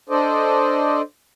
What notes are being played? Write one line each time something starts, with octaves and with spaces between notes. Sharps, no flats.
D4 A4 C5 D5 D#5